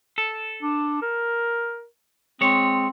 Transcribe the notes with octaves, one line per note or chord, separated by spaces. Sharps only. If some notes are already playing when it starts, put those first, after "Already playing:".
A4
D4
A#4
G#3 C4 C#5